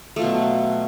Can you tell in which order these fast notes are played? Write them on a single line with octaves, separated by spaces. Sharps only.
A3 F4 B2 F#3